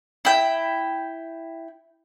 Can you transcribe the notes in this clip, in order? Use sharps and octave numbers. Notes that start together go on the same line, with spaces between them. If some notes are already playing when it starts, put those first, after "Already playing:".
E4 G5